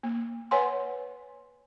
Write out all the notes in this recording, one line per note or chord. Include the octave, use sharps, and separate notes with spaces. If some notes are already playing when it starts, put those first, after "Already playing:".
A#3
B4 C#5 F#5 G#5 C6